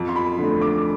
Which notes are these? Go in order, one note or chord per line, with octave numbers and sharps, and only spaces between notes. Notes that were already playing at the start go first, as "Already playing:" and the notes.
Already playing: F2
C6
B5
D3 A3
D6